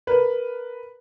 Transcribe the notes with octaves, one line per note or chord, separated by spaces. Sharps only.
A#4 B4